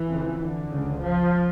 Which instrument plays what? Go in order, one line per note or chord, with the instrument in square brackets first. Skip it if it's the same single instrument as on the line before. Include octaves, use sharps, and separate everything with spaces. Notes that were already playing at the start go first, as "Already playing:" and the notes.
Already playing: [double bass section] E3
F2 C#3
D3
C#2 C#3
F3